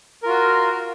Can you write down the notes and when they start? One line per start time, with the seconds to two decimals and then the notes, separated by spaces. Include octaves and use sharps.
0.23 A#4
0.26 F4
0.29 F#4